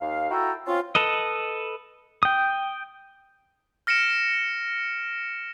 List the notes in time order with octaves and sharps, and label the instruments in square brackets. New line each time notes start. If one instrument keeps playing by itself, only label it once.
[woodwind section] D#2 F5
E4 F#4 A4 G5 A#5
C4 C#4 F4
[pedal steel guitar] A4 B4 D#5
G5 D#6
[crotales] F6 A#6 C#7 D7 E7